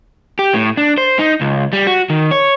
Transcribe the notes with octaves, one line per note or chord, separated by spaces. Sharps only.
G4
A2
D4
C5
D#4
C#2
G3
F#4
D#3
C#5